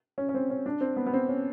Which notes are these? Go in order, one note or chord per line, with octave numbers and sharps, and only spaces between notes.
C#4
C#4
C4
C#4
D4
C4
B3
B3
C4
C#4